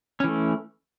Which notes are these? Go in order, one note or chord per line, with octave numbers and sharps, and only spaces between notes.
E3 A3 C#4